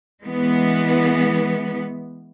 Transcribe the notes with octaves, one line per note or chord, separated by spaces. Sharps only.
E3 G#3 B3